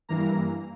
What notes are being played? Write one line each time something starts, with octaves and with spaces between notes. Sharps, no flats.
G2 E3 A#3 A#5